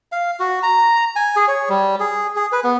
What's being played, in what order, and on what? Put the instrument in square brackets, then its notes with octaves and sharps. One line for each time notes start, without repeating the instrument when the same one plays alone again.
[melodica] F5
F#4
A#5
G#5
G#4
C#5
G3
G#4
G#4
B4
B3